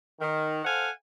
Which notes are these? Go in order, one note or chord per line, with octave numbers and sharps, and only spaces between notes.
D#3
A4 C5 F5 F#5 G#5